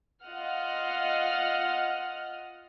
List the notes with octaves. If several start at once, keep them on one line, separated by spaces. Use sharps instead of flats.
F4 D#5 F#5 F6